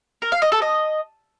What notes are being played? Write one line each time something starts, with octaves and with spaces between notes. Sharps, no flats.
A#4
F5
D#5
A4
D#5